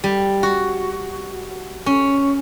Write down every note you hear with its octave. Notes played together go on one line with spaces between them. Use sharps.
G3
F#4
C#4